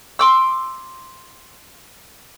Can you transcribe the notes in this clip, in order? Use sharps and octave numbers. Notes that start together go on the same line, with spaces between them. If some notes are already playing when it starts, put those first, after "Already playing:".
C6 D6 E6